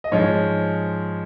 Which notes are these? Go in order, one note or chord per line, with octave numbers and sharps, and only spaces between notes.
D#5
G#2 F3 G#3 C#5